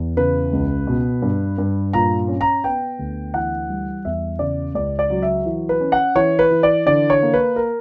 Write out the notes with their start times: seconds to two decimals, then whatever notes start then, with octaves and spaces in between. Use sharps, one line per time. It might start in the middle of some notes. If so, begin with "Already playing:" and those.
Already playing: E2
0.17 C#3 B4
0.53 C#2
0.87 B2
1.22 G2
1.58 G2
1.93 A#2 A#5
2.28 C#4
2.41 A#5
2.64 B3 G5
2.99 D2
3.34 E3 F#5
3.69 G3
4.05 E2 E5
4.39 C#3 D5
4.74 C#2 D5
4.99 D5
5.10 F#3
5.23 E5
5.45 E3
5.69 B4
5.81 C#4
5.92 F#5
6.15 E3 C#5
6.39 B4
6.51 E3
6.63 D5
6.86 D3 D5
7.10 C#5
7.22 A#3
7.34 B4
7.56 A#4